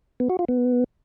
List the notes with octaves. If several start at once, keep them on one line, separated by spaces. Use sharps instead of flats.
B3
F#4
F4
B3